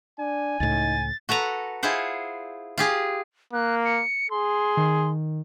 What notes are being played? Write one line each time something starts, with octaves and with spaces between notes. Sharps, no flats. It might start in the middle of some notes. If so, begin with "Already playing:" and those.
D4 G#5
C#2 A2 D#4 A6
F#4 A4 B4 A#5
E4 F4 G#4 C5 F#5
F4 G4 G#4
A#3 F#6
C#7
G#4 C6
D#3